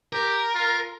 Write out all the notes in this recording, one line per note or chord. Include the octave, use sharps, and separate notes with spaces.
G4 A#4
F4